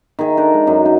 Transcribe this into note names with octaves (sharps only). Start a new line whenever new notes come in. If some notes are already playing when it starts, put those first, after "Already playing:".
D#3 G#4 E5
D4 D#4 A4 A#4
G#3
F#2 F#3 G#4
D#4